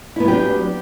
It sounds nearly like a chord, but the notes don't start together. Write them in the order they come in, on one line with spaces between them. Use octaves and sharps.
E4 B3 F#3 G4 D4